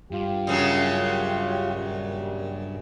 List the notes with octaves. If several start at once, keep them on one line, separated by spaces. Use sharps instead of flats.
G2 F4 G4
F#2 C#3 F#3
A#2 G3